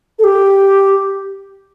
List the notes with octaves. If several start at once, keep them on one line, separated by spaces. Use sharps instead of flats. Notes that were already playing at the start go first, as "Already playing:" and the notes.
A4
G4